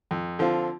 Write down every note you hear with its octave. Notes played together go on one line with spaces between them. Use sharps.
F2
D3 F3 C4 F4